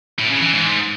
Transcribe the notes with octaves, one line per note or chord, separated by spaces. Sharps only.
A2
C#3
E3
G#2